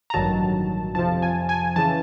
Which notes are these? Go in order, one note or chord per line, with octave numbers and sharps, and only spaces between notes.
A#5
A1 G2 D#3 F#3 A5
F2 C3 F3 A5
G#5
G#5
C#3 E3 A5